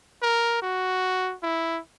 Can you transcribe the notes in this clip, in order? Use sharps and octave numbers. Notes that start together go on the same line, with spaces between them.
A#4
F#4
E4